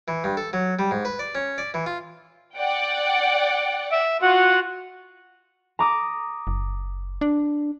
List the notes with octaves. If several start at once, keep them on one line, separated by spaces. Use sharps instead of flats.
E3
G2
A4
F#3
G3
G#2
B4
D5
C#4
D5
E3
F4
D5 F#5 G5
E5
F4 F#4 F#5
A#5 D6 D#6
F#1
D4